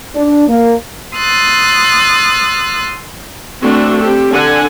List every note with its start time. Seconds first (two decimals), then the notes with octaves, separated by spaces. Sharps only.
0.15 D4
0.48 A#3
1.14 C6 D#6 E6 F#6 A6
3.62 A3 C4 D4 F#4 A4
4.00 C4 G4 A4
4.31 D3 D4 A4 F#5 G#5